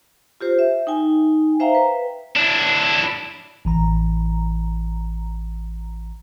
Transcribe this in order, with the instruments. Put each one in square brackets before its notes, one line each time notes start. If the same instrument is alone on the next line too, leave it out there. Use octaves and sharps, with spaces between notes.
[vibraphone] F4 G4 C5
E5
D#4 G5 G#5
C5 E5 F5 G5 A#5
B4
[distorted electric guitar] D4 E4
[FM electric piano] A1 E3 A#5